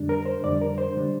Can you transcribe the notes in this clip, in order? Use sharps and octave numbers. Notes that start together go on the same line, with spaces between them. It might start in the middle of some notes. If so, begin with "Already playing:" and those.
Already playing: F2 D3 G3 D4
A#4
C5
F2 D3 G3 D4 D5
A#4
C5
D3 G3 D4